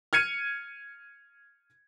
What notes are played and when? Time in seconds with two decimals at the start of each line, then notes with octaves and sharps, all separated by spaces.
0.13 F6 G#6 C#7 D#7